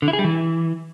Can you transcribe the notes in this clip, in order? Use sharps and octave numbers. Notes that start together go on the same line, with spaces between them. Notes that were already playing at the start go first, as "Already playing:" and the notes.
D3
E4
G#4
G3
E3